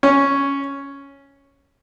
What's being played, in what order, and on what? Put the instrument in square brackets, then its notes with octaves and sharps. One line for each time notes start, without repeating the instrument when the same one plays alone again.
[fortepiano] C#4